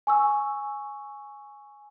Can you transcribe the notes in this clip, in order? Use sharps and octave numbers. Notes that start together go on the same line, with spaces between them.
G#5 C#6 E6